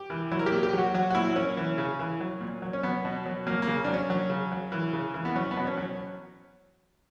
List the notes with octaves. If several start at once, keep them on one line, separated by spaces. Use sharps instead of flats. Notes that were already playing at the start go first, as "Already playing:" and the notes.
Already playing: G4
E3
F#3 E4
A#4
G4
A#2
G4
F#3 F#4
F#3 F#4
F#4
A#2 E4
F#3 C#4
E3
C#3
E3
F#3
A#2
F#3
C#4
F#3 B3
B2
F#3
F#3 A#3
A#3
C#3
F#3 D4
C#4
F#3
C#3
F#3
E3
C#3
E3
B3
F#3 C#4
B3
B2
C#4
F#3